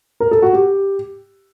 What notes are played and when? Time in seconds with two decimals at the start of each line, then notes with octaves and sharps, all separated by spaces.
0.20 A#4
0.31 A4
0.42 F#4
0.53 G4